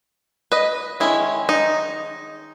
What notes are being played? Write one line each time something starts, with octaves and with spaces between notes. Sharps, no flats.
B4 D#5
D#3 G#3 C#4 E4
D#4